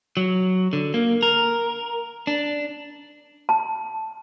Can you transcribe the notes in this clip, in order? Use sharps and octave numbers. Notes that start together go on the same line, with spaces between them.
F#3
D3
A#3
A#4
D4
A5